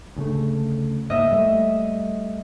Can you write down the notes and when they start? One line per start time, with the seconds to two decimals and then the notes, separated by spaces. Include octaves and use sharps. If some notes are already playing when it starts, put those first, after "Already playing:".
0.16 D2 C#3 A3
1.10 G#2 A#3 D#5 E5
1.31 G3 A3